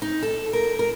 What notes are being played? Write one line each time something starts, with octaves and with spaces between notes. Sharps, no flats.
D#4
A4
A#4
A#4